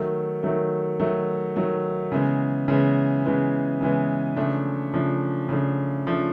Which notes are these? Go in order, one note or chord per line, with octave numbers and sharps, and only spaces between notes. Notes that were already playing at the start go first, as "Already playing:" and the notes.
Already playing: D#3 F#3 A3
D#3 F#3 A3
D#3 F#3 A3
D#3 F#3 A3
C#3 E3 G#3 B3
C#3 E3 G#3 B3
C#3 E3 G#3 B3
C#3 E3 G#3 B3
C#3 F3 A3 D4
C#3 F3 A3 D4
C#3 F3 A3 D4
C#3 F3 A3 D4